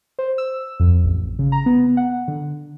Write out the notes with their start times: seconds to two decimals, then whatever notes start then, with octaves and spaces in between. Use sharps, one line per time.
0.19 C5
0.38 E6
0.80 F2
1.04 A1
1.39 C#3
1.52 A#5
1.66 B3
1.97 F#5
2.28 D3